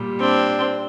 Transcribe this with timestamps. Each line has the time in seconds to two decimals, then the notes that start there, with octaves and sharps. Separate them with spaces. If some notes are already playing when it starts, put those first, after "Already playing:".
Already playing: A#2 G3
0.19 C4 D4